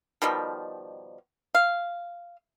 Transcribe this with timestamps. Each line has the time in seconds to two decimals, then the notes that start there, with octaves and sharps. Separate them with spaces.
0.22 B2 D#3 F3 G3
1.55 F5